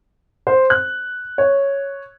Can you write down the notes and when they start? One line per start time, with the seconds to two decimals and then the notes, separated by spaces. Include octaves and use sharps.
0.47 C5
0.70 F#6
1.38 C#5